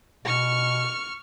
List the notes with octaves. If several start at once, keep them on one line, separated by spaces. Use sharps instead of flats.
B2 C#6 F6